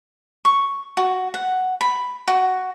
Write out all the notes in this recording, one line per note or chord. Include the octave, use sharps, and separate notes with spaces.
C#6
F#4
F#5
B5
F#4